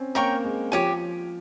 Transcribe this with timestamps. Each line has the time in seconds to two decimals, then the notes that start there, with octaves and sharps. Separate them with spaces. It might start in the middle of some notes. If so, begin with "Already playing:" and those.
Already playing: C4 C#4
0.15 A#3 A#4 C#5 G5 C#6
0.44 G#3
0.72 F3 G4 C#5 G#5